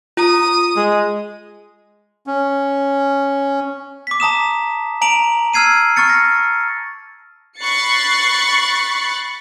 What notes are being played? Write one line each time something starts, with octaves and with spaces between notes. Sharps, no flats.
F4 A#5 D#6
G#3
C#4
D6 B6
A5 A#5 D#6 E7
A5 A#5 D7 F7 F#7
E6 F6 G#6 C7 D#7
C#6 F6 A6 C#7
A#6
B5 C#6 F#6 A6 C7 C#7